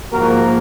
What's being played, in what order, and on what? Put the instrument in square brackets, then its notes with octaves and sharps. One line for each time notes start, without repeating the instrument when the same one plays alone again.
[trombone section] G#2 F3 A#3 F#4 A#4